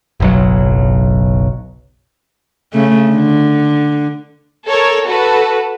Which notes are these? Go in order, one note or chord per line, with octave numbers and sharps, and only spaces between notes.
F#1 B1 F#3
C#3 A3
D3
A4 A#4 C#5
F#4 A4 B4